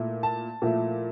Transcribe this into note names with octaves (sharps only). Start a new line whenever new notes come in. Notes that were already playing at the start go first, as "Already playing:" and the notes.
Already playing: A#2 A3 E4
A5
A#2 F3 A3 E4